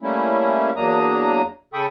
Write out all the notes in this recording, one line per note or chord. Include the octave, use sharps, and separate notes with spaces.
G3 A3 A#3 C#4 E4
E2 F#3 A#3 D4 A#5 D#6
C#3 A4 G5 B5 C#6 D#6